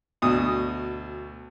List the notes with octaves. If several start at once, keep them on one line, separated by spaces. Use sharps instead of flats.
D2 B2 D#6